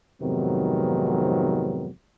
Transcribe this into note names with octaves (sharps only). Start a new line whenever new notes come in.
F2 G#2 C3 D#3 F#3 B3